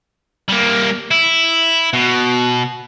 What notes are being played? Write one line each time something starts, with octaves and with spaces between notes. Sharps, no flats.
G3 A#3
E4
B2